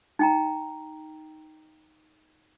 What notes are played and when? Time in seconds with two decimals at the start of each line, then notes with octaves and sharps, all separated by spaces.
0.19 D#4 G5 A#5